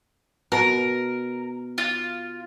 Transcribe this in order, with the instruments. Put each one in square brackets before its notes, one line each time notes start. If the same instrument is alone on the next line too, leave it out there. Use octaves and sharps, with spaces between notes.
[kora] B2 [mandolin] A#4
[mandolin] F4